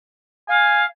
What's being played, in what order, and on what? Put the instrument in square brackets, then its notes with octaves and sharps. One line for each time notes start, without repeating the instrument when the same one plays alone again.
[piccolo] F5 [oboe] G#5